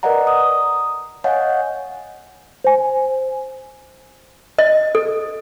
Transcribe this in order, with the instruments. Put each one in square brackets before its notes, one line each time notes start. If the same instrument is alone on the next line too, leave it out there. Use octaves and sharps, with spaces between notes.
[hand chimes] A#4 B4 D5 D#5 F#5 A#5
D#6
C#5 D#5 F5 F#5 G#5
[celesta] C5 G#5
[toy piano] D#5
A4